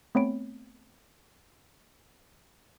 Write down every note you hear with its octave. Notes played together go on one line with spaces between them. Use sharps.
A3 B3 C4 C#5 B5 D7